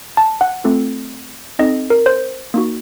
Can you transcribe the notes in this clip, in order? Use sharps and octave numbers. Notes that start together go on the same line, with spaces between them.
A5
F#5
A3 C4 F4 A4
C4 D#4 A4 D#5
A#4
C5
A#3 D#4 F#4